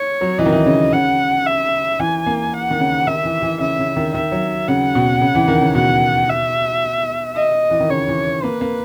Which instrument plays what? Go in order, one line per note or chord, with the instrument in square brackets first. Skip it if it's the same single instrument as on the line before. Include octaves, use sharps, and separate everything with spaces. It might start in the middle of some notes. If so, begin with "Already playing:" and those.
Already playing: [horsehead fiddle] C#5
[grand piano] F#3
[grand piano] E3 [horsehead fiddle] D#5
[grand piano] D#3
E3
C#3
[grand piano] C#3 [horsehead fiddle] F#5
[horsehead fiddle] E5
[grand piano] E3 [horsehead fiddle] G#5
[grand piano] A#3
[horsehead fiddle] F#5
[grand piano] D#3
C#3
[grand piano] D#3 [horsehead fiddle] E5
[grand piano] E3
E3
[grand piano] C#3 [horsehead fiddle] E5
[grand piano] C#3
D#3
[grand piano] D#3 [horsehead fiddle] E5
[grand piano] F#3
[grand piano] C#3 [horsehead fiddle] F#5
[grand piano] B2
C#3
E3
D#3
C#3
[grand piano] B2 [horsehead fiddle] F#5
[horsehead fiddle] E5
D#5
[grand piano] E3
D#3
[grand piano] C#3 [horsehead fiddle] C#5
[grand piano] E3
[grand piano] A#3 [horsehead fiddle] B4
[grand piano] A#3